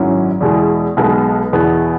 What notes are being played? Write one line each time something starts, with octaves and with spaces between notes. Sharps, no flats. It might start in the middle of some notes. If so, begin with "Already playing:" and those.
Already playing: G#1 F#2 F#3 C#4 E4
E2 B2 G#3 E4
B1 B2 G#3 B3
E2 B2 B3 E4